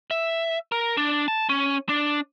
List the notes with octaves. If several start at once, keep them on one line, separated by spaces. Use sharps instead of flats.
E5
A#4
D4
A5
C#4
D4